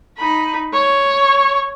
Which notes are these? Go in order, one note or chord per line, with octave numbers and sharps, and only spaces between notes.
D#4 B5
C#5